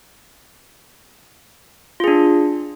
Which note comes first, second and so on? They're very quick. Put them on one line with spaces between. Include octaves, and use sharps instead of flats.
F4 G#4 D4